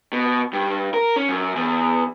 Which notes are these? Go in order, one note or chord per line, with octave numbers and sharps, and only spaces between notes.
B2
G2
A#4
C#4
F#2
E2